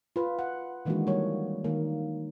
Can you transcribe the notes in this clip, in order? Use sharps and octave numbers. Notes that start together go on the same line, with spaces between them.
F4 B4
F#5
D#3 E3 G#3 A#3 D4 F#4
G3 A#3 C#5
D#3 A#3